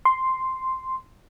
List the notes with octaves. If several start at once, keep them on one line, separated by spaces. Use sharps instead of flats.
C6